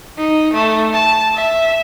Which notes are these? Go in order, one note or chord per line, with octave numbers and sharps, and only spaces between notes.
D#4
A3
A5
E5